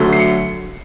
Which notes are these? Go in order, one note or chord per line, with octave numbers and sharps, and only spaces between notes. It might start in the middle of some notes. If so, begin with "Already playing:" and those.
Already playing: D2 D3 F#3 A3
C7
C#7